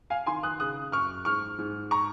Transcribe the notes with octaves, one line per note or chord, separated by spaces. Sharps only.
F5 G#5
D#3 G#5 C6
D#6 F#6
C#3 D#6 F#6
F#2 C#6 F6
G#2 C#6 F6
G#2
A#5 C#6